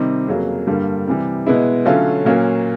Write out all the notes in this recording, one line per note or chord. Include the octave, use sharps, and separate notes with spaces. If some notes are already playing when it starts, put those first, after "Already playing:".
Already playing: C3 D#3 G3 C4
F2 C#3 F#3 A#3
G2 D3 G3 A#3
C3 E3 G3
B2 G#3 B3 E4
D3 F#3 A3 C#4 F4
A#2 F#3 A#3 C#4 F4